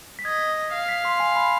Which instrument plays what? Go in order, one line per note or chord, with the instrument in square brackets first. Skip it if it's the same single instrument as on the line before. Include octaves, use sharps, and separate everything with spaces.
[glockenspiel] B6
[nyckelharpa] D#5 [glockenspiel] G#6
[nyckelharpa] F5
[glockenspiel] B6
C6
G#5
B5